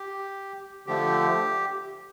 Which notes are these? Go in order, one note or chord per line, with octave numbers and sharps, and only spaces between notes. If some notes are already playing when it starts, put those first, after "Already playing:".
Already playing: G4
D3 F3 A3 G4